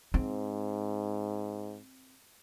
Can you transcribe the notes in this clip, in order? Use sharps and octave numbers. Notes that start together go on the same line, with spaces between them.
G#2 C4